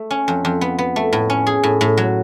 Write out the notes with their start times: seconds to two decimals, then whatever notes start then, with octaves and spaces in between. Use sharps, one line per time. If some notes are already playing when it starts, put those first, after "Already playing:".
Already playing: A3
0.11 C#4
0.28 F2
0.45 F2
0.61 B3
0.78 B3
0.96 A3
1.13 A2
1.30 C#4
1.47 G#4
1.63 A2
1.81 A2
1.97 F#3